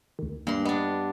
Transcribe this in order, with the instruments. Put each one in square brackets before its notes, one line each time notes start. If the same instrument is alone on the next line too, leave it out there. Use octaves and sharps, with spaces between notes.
[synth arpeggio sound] D2 D#3
[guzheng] G2 C6 [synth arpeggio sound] A#3
[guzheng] B3 D4 [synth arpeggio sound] D#5